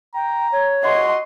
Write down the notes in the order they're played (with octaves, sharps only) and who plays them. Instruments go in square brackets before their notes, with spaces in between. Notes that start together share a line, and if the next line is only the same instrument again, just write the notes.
[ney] G5 [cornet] A#5
[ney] C#5
[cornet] F#4 [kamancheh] D#5 C6